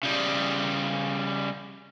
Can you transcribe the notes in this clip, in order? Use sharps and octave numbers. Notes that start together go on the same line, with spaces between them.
C#3 G3